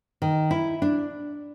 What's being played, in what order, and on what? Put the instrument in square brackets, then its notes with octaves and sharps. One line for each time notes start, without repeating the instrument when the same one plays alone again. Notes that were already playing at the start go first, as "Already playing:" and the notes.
[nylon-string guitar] D#3
E4
D4